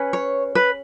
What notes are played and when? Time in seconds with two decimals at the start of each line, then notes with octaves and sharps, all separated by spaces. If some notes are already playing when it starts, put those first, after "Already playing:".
Already playing: C#4 G#4 B4
0.13 C#5
0.55 B4